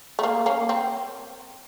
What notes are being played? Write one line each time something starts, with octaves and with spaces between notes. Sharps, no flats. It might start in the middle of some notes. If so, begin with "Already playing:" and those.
A3
A#3
A#3 C#4
C4